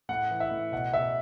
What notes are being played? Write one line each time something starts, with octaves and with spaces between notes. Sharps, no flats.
A2 F#5
E3
E5
A2
B2 F#5
B2 E5